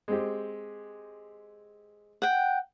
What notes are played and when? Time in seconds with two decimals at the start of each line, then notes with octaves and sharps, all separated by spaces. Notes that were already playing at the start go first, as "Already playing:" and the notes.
0.08 G#3 C4 G4
2.22 F#5 G5